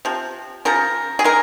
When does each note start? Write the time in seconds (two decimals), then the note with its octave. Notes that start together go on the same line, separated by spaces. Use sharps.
0.05 C3 F3
0.65 C#3 F3 A#4
1.19 G#4
1.24 G#3 A#4